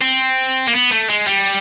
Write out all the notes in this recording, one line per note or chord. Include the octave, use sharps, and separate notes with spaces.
C4
A#3
B3
A3
G#3
G3